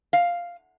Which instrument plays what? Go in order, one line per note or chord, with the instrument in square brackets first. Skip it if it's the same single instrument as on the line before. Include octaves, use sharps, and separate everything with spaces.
[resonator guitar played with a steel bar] F5